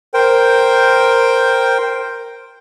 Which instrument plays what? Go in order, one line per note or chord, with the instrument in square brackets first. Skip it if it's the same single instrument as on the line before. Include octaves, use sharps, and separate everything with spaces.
[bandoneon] A#4 C5 G5